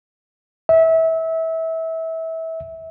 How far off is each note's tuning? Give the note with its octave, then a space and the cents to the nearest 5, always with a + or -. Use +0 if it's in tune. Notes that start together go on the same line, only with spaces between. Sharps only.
E5 -25